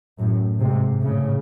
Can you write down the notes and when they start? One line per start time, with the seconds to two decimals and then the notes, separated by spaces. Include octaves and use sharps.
0.19 F#2 A2
0.60 G#2 C3
1.02 A2 C#3